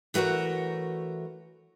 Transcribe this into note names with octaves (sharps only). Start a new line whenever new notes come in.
E3 A3 F#4 A#4 C#5